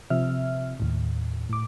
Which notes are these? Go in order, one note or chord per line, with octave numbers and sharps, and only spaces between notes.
C3 F3 C4 E5 F6
D#2 A2
A2 D6